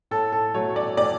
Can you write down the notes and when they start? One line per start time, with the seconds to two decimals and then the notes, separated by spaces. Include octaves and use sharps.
0.11 A2 A4
0.32 A4
0.54 F#3 A3 C#5
0.76 D5
0.97 A2 D5